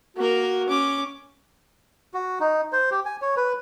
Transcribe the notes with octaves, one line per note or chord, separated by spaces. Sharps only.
A#3 F#4 A#4
C#4 D6
F#4
D#4
C5
G4
G#5
C#5
B4